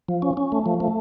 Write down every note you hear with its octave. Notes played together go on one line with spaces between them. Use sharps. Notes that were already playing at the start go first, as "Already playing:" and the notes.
F3
C#4
C#4
A3
F3
A3